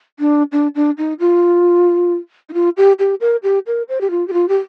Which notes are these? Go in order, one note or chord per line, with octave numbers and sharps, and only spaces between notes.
D4
D4
D4
D#4
F4
D#4
F4
G4
G4
A#4
G4
A#4
C5
G4
F4
G4
F4
G4